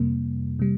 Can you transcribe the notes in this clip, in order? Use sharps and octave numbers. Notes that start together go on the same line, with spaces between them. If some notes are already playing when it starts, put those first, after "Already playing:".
Already playing: F2 C3 G3 A#3
C3 G3